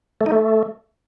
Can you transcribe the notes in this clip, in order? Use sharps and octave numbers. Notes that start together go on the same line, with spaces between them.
A3
D#4
A3